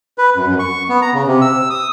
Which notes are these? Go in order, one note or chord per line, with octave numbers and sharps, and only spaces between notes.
B4
F#2
F#2
C#6
B3
A#5
C#3
C3
E6
D#6